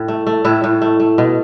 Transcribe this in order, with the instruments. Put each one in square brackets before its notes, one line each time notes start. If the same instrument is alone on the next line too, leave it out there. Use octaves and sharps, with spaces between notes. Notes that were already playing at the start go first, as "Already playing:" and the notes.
Already playing: [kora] A2
A3
A3
A2 E4
A2
A3
A3
B2